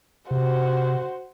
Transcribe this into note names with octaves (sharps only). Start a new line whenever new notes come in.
C3 F#4 C5